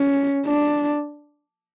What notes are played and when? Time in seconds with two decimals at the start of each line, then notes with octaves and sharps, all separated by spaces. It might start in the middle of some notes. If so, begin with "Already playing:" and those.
Already playing: C#4
0.46 D4